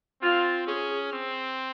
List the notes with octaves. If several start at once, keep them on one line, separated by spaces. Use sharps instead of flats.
C4 F4
C#4 G#4
C4